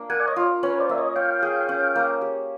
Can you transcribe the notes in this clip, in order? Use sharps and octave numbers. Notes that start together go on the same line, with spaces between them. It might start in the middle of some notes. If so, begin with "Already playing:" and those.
Already playing: A#3 D4
A#4 F#5 G#5
D5
C#5 D#5
F4
C#4 B4 C#5
C5 D5
A#3 E5
C#5 D#5
C#5 F5 G5
G#4
C#4
A#3
G4